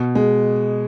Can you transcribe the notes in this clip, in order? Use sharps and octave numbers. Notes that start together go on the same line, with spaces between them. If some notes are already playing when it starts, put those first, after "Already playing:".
Already playing: B2
G#3